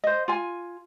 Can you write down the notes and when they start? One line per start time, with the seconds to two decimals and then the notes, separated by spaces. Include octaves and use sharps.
0.04 C5 D#5
0.28 F4 G#5